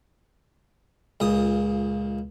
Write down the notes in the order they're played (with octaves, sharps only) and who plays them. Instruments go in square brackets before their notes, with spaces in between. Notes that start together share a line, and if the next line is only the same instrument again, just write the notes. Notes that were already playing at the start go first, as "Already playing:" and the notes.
[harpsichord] C#2 A#2 D#6